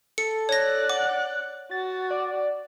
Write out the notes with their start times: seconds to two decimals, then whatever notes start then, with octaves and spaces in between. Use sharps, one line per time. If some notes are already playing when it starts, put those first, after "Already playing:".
0.18 A4 C#7
0.49 C#5 D5 F#6 A#6
0.89 F#5 D6
1.71 F#4 A6
2.11 D5